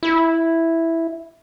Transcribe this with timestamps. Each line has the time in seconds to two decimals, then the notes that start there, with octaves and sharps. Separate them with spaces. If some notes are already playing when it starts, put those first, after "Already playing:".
0.03 E4